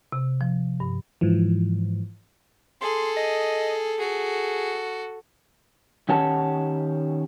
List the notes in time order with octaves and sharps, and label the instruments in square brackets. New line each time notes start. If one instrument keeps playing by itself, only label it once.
[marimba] C3
F3
G2
[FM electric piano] G#2 E3 F3
[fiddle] G#4 A4 [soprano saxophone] C6
[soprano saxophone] D#5
[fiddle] F#4 A4 [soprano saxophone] G#4
[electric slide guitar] D#3 C#4 G4 C#5 F#5 A5